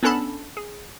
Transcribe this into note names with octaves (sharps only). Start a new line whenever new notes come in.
B3 C#4 D4 A4 A5 B5
G#4